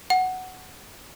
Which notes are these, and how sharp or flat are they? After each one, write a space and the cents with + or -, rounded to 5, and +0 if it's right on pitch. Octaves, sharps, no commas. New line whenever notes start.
F#5 +5